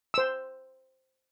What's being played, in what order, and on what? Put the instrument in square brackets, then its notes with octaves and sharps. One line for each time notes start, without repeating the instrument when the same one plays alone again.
[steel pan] C5 E6